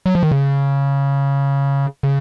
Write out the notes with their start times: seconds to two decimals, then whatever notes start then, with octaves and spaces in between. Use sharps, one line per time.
0.06 F#3
0.15 F3
0.23 D#3
0.31 C#3
2.03 C#3